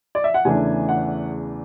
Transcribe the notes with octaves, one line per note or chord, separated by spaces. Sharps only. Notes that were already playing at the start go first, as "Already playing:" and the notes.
D5
E5
F#5
E2 C#3 E3 A3 D4 G#5
F#5